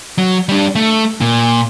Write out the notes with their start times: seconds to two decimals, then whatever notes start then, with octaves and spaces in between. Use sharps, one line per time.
0.18 F#3
0.49 G3 D4
0.75 A3
1.21 A#2